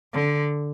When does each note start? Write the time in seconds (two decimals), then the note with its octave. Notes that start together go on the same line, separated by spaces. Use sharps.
0.14 D3